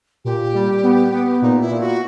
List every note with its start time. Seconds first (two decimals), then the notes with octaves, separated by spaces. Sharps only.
0.25 A#2 G4
0.54 G3
0.83 B3
1.12 B3
1.42 A#2 D#4
1.61 E4
1.70 A#2
1.80 F#4